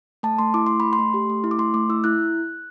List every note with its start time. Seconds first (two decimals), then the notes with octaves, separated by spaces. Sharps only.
0.23 A3 A5
0.38 A3 C6
0.54 E4 D6
0.67 A3 C6
0.80 A3 B5
0.93 C6
0.99 A3
1.14 G4
1.30 A3
1.44 E4
1.51 D6
1.59 A3 C6
1.74 A3 D6
1.89 E4 E6
2.04 E4 F#6